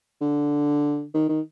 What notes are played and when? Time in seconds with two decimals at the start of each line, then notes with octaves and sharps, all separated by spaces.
0.21 D3
1.14 D#3
1.29 D#3